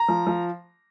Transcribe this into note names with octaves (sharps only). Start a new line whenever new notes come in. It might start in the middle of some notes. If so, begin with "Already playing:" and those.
Already playing: A#5
F3
F3